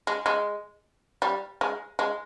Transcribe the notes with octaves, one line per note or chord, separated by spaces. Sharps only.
G#3
G#3
G3
G#3
G#3